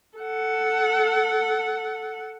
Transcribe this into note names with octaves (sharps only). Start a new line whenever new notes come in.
A4 F#5